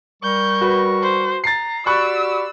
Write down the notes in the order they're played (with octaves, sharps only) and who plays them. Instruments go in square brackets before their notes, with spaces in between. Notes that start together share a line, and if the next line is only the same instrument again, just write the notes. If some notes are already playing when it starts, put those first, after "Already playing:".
[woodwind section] G3 A#4 C#6 [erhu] G6
[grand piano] F#4 B4
[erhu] C5
[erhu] A#5 [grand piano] A6 C7
[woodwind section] F#4 G4 D5 [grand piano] B5 C#6 F#6 [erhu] E6